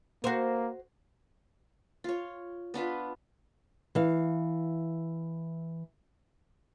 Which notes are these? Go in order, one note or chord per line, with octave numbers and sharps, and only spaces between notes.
A#3 F#4 C5
F4 C#5
B3 D4 F4 B4
E3 F5